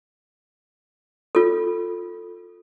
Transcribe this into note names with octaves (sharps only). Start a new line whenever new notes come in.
F4 A4